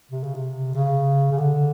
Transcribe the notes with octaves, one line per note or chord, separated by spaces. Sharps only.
C3
C#3
C3
C#3
C#3
D3